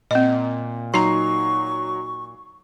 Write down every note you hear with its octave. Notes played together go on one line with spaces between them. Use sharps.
A#2 C4 D#5
F#3 D#4 A#5 C6 C#6 C7